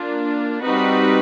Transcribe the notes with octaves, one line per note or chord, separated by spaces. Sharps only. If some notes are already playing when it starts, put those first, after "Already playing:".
Already playing: A#3 D4 F4
G3 C4 D#4 F#4 B4